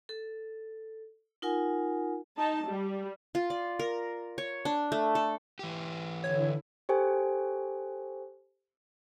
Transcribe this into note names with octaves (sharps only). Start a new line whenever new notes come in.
A4
D#4 F4 A#4 F#5 G#5
D#4 A5
G3
F4
D5
A#4
C#5
D4
A3
A4
E3 G4
D3 E4 C#5
G4 A4 C5 G5 G#5